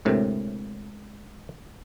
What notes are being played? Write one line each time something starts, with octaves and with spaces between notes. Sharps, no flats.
D2 A2 C3 G#3 A#4 C#5